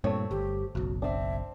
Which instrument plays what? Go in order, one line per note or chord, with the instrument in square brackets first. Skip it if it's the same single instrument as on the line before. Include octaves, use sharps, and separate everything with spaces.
[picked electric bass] G2 A#2 [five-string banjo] A3 C4 C#5
[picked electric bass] G1 [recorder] G4
[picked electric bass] F#1 B1 [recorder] F#4
[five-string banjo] C4 D4 [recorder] E5